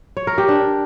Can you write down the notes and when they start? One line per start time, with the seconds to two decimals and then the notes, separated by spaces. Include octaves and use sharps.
0.17 C#5
0.27 A#4
0.38 G4
0.48 D4